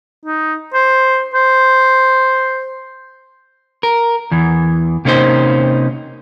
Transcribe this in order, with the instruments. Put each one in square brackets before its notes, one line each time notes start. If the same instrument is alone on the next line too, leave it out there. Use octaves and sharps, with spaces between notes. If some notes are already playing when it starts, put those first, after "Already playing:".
[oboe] D#4
C5
C5
[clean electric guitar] A#4
E2 E3
C3 A#3 C#4 D#4 C5